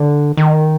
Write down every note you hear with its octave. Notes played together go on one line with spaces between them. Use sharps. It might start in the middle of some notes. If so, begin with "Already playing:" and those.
Already playing: D3
D#3